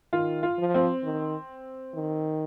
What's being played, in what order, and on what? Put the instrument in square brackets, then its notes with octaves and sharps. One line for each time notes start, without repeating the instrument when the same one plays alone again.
[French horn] D#3 [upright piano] F4
[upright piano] F4
[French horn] F3
[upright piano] C4
[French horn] D#3
D#3